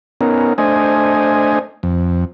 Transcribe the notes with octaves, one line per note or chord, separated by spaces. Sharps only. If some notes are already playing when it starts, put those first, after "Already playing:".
B3 C#4 D#4 A#4
A3 D4 C5 D#5 G#5
F2